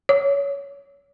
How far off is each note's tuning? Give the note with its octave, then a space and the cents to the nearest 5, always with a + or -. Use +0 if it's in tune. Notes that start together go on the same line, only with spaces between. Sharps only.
C#5 +20